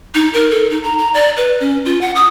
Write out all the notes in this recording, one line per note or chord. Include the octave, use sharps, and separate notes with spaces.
D#4
A#4
A4
D#4
A#5
A#5
D5
B4
C#4
F4
F#5
D#6